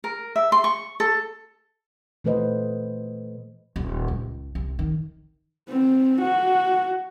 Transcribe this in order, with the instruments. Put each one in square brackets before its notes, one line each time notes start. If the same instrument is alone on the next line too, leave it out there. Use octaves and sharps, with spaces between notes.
[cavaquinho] A#4
E5
C6
C#6
A4
[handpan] A#2 E3 A3 B4 C5 D#5
[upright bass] D#1
C#2
C2
D#3
[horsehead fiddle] C4
F#4